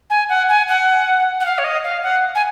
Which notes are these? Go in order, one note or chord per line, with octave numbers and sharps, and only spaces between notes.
G#5
F#5
G#5
F#5
F#5
F5
C#5
D#5
F5
F#5
G#5